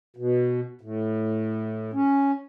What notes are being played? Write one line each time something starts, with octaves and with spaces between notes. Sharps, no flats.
B2
A2
C#4